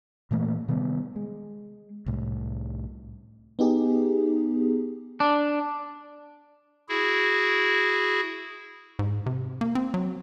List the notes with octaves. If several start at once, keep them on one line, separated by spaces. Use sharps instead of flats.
A#2 E3 A3 A#3
C3 D#3 G3 B3
G#3
C2 A2
B3 D#4 G4 G#4
D4
E4 F#4 G#4
G#2
C3
A#3
C4
F#3